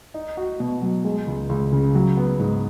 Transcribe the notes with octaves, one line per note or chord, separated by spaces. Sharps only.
D#4
F#4
B2
F#3
G#3
C#2
C#2
C#3
F#3
B3
G#2